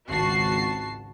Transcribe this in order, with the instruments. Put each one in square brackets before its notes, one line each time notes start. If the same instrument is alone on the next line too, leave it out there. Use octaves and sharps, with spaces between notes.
[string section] G#1 C#2 F#4 A5 C7